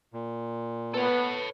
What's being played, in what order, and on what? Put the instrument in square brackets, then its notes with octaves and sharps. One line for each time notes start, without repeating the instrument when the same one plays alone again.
[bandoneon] A#2
[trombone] B3 [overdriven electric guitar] A4 C#5 [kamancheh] B4